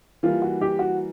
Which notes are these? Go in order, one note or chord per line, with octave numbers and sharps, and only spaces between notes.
E3 G3 A#3 F4
F#4
G4
F#4